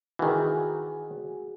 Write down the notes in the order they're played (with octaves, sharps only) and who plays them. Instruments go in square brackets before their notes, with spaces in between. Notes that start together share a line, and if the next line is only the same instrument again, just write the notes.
[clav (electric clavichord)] D#3 E3 [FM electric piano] F#4 G#4